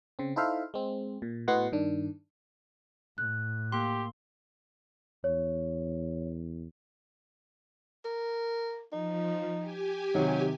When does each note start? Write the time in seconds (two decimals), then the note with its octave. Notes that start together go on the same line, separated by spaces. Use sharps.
0.19 C#3 C4
0.36 D#4 E4 A4 C5 E5 F5
0.74 G#3 C4
1.22 A#2
1.48 A2 B3 F#4 D#5 F#5 C6
1.72 G2 D#3 D4
3.18 A2 F#6
3.72 A#3 G4 C6
5.24 E2 C#5
8.05 A#4
8.92 F3 D#4
9.56 G4 G#5
10.15 C3 D#3 F#3